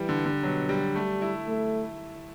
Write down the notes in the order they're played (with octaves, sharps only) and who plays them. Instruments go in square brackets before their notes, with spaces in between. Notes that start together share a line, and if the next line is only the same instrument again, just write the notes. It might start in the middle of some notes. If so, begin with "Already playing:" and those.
Already playing: [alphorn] E3 [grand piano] G3
[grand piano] D3
D3
[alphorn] B2 [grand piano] F#3
[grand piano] G3
[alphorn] G3 [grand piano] A3
[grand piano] E4
[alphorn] A3